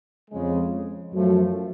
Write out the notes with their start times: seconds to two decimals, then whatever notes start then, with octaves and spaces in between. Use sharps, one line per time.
0.30 F2 C#3 G#3
1.12 F#2 F3 A3